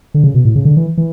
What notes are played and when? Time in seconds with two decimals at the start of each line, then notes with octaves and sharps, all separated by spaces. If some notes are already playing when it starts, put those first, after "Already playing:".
0.14 D3
0.24 C#3
0.34 B2
0.45 A2
0.56 C#3
0.65 D3
0.77 E3
0.98 E3